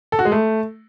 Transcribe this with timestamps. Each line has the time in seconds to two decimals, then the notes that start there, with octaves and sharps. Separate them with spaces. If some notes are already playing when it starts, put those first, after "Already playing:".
0.12 A4
0.19 F#4
0.25 G#3
0.32 A3